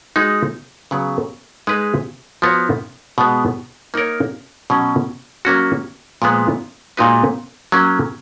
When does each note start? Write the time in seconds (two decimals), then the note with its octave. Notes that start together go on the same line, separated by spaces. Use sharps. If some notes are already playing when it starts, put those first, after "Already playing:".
0.16 G#3 D#4 F#4
0.91 C#3 F#3 B3
1.67 G#3 D#4 G#4 B4
2.42 F3 B3 F#4 C#5
3.18 B2 G#3 B3
3.94 A#3 D#4 A#4 C#5
4.70 B2 F#3 C#4
5.45 F#3 A#3 C#4 F#4
6.22 A#2 F3 G#3 B3
6.97 A#2 G#3 D#4 F#4 B4
7.72 F#3 A#3 C#4